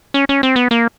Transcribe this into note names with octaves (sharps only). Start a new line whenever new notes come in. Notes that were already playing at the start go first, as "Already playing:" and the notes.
C#4
C#4
C4
B3
A#3